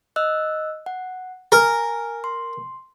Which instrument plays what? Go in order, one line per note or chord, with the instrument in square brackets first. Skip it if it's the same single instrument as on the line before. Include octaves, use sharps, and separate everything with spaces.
[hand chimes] D#5 E6 F#6
F#5
[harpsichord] A#4 [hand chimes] G#5
[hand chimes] C6